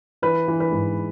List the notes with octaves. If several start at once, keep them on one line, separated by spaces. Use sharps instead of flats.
E3 B4
E3
B4
G#2